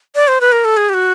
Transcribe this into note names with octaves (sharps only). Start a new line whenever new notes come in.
D5
C5
B4
A#4
A4
G#4
G4
F#4